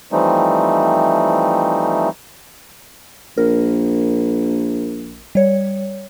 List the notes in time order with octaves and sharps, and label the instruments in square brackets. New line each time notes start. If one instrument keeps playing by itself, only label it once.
[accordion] E3 F3 G3 A3 C4 D#4
[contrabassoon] A#1 [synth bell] A#4
[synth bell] G3 C#5